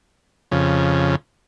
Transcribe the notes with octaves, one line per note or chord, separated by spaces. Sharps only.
F2 C#3